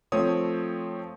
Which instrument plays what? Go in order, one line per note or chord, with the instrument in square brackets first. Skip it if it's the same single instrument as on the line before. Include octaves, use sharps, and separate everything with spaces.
[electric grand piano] F3 A3 C4 C#5 D#6